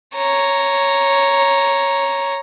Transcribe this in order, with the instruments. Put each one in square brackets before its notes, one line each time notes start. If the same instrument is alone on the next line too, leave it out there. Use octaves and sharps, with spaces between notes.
[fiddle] C#5 A#5